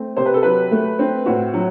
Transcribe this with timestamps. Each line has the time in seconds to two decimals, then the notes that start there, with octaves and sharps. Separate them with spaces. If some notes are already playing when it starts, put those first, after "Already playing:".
Already playing: A3 C4
0.17 C3 C5
0.26 B4
0.34 A4
0.43 F#3 B4
0.71 A3
0.99 C4
1.26 A2 F#4
1.54 F#3